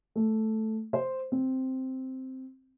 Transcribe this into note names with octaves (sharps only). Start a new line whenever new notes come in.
A3
C5
C4